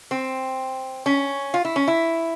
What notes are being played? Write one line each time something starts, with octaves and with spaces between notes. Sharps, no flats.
C4
C#4
F4
E4
C#4
E4